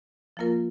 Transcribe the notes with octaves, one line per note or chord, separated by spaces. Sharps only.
F3 A#3 F4 A#4